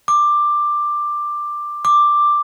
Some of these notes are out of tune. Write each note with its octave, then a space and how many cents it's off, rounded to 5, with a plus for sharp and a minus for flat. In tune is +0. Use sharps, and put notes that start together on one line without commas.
D6 +10
D6 +5